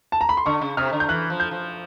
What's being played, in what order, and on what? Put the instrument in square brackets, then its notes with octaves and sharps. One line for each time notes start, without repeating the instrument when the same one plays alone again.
[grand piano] A5
A#5
B5
C6
[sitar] D3 [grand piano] C#6
[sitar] C#3
[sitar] C3 [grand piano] F6
[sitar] D3
[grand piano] G6
[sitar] E3 [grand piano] F#6
[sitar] F3
[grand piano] G6
[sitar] F3